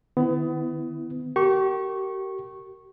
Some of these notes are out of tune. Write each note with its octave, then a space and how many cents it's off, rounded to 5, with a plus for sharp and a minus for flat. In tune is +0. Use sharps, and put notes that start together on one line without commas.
D#3 -25 B3 +30 E4 +0
G4 -40 A#4 -25 C#6 -15